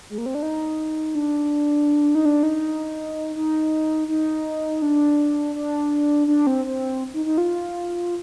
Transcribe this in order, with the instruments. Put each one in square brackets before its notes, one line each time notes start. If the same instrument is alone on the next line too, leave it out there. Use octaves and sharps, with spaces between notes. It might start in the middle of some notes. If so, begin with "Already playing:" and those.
[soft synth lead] G#3
A#3
C4
D4
D#4
D4
D#4
D4
D#4
D#4
D#4
D4
D4
D4
C4
C4
D#4
D#4
F4